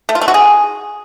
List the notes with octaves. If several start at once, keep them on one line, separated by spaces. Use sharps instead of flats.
A3
F4
A3
F#4
G#4